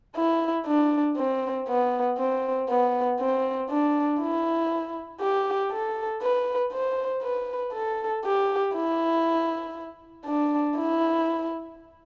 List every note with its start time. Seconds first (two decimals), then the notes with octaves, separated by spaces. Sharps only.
0.16 E4
0.66 D4
1.17 C4
1.68 B3
2.18 C4
2.69 B3
3.20 C4
3.70 D4
4.20 E4
5.20 G4
5.72 A4
6.22 B4
6.73 C5
7.23 B4
7.73 A4
8.24 G4
8.74 E4
10.26 D4
10.77 E4